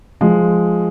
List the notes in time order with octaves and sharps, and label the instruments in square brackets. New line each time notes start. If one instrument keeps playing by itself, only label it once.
[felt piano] F3 G#3